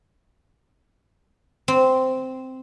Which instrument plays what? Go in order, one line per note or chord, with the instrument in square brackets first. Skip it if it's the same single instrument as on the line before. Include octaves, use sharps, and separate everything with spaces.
[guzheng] C4